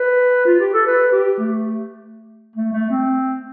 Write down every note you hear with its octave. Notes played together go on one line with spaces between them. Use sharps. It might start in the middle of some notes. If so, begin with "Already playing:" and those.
Already playing: B4
F4
G4
A4
B4
G4
A3
A3
A3
C4